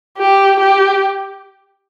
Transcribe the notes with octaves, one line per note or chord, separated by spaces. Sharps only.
G4
G4